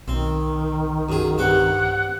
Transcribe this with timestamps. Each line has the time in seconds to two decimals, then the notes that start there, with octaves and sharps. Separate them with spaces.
0.08 B1 D#3 C4
1.09 F#2 G#4
1.38 G2 C4 F#5 D6